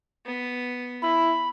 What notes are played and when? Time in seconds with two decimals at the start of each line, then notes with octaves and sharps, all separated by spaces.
0.26 B3
1.02 E4 B5